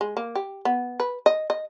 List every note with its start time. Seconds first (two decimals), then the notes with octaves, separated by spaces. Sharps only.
0.01 G#3
0.17 A#3
0.35 G4
0.65 B3
1.00 B4
1.26 D#5
1.50 D#5